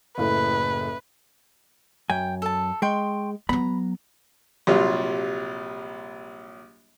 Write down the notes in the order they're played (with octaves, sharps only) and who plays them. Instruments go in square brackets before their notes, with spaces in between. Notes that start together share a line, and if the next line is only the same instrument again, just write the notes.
[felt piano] F#1 A2 [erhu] B4
[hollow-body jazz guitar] F#2 G#5 [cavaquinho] G5
[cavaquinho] A4 A5
[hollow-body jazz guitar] G#3 [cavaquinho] G5 C6 C#6
[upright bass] F#3 B3 [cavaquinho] A#5 [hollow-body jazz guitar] B5
[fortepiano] A#1 C3 F#3 G3 F4